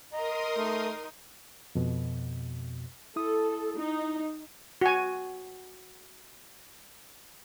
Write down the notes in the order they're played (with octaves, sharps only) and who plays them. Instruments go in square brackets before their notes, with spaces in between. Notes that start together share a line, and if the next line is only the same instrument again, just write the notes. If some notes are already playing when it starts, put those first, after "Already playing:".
[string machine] A#4 C6 D#6 [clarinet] D#5 [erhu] A#5
[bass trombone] A3 [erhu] D#4
[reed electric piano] F2 B2
[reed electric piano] E4 D#6 [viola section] A4
[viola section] D#4
[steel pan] F#4 G#5